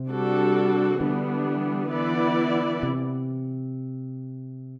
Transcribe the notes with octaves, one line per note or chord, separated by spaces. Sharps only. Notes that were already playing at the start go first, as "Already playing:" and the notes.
Already playing: C3
G3 D4 F#4 A4
D3 E3 G3 B3 D4
E3 B3 E4 B4 D5
C3